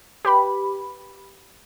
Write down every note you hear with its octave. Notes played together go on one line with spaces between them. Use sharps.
G4 B4 B5